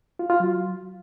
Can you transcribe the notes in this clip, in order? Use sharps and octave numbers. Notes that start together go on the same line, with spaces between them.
F4
F4
F#3